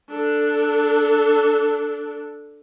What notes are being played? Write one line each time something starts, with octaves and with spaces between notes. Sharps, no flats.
D4 A4